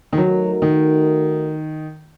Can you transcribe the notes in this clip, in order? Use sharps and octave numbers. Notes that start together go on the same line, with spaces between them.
D#3
F#3 A3 D#4 F#4 A#4
D#3